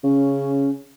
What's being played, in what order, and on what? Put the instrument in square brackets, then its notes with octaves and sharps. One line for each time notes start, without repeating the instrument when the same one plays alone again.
[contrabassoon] C#3 [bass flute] C#4